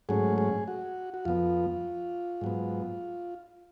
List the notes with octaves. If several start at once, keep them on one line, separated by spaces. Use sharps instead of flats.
G#2 F#3 A3 C#4 G#4
G#4
F#4
F#4
F2 F3 B3 F4
G#2 F#3 B3